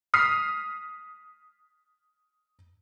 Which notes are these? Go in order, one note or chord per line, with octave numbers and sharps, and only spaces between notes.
D#6 F6 B6 C7